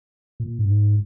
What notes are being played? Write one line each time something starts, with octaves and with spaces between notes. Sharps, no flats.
A#2
G2
G#2